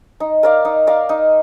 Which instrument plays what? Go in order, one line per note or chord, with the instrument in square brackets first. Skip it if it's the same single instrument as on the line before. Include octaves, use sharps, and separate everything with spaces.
[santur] D#4
A#4 D5 F5
D#4
A#4 D5 F5
D#4